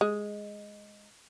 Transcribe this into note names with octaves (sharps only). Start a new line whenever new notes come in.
G#3